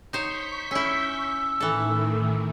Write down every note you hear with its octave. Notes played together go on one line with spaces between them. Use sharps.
D#4 C5 C#5 C#6 G6 B6
C#4 E4 E6
A2 D#3 E3 A3 A4